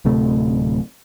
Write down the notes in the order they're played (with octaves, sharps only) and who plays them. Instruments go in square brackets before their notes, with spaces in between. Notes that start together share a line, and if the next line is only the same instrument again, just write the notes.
[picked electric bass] D1 C3 A3